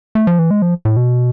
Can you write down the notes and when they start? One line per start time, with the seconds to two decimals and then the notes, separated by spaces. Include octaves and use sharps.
0.15 A3
0.27 F3
0.39 E3
0.51 G#3
0.62 F3
0.85 A2
0.97 B2